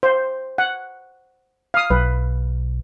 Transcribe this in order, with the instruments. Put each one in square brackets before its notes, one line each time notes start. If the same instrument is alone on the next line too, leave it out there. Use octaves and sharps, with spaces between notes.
[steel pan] C5
F#5
F5 D#6
[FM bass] B1 [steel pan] B4